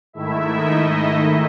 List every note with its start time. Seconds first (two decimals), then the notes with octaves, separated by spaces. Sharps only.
0.13 G#2 D#3 A3 E4 E5
0.50 D#4 D#5